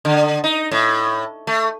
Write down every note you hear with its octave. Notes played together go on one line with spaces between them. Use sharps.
D3
D#4
A2
A3